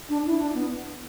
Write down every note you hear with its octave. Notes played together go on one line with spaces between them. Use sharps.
D4
E4
D4
B3